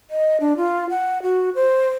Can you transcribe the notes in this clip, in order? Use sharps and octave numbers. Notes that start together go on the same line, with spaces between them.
D#5
D4
F4
F#5
F#4
C5